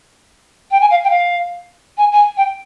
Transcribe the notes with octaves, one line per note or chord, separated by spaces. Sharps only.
G5
G#5
F5
G5
F5
G#5
G#5
G5